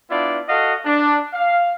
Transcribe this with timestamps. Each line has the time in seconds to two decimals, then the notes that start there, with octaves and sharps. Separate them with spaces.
0.11 B3 D4 E4 F4 D5
0.49 F#4 A4 D#5 F5 F#5
0.86 D4
1.34 F5